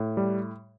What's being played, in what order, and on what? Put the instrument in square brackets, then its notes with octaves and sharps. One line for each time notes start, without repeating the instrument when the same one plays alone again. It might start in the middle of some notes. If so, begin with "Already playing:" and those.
Already playing: [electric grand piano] A2
G3